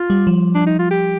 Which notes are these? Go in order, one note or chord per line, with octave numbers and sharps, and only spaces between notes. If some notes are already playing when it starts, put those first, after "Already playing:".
Already playing: F4
G3
F3
D4
D#4
F4
G4